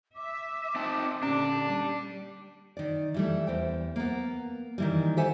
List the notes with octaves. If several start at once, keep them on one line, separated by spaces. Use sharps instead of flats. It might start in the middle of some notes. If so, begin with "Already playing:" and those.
E5 D6
C4 D#4 A5
A#2 D3 C#4 D4 G4
G3
D#3 D5
E3 G3 A3
E2 C5 G5
A#3 B3
D#3 E3 G3
G4 A4 C5 E5 F#5 G#5